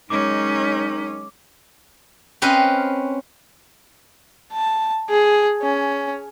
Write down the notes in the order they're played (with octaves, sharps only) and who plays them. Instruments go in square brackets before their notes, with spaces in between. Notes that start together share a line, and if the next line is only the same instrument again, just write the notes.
[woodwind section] D#3 F#3 D#4 [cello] G#3 C#4 [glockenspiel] D6
[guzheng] C4 C#4 B4 C5 D#5 F5
[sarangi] A5
G#4
C#4